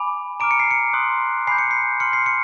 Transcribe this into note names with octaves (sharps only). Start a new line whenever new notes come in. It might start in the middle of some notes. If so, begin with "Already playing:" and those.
Already playing: G#5 B5 D6
A#5 D6 F6 D7
C#7
C7
C#7
C6 D#6 F#6
G#5 B5 D6 G6 C7
C#7
C7
C6 F6 C#7
C7
C#7